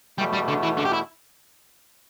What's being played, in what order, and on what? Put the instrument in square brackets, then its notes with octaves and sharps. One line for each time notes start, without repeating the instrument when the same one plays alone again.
[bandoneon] E2 B2 A3 [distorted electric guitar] G3
[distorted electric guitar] G3
D3
E3
D3
G4
E4